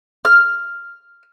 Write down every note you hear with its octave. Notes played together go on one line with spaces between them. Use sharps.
F6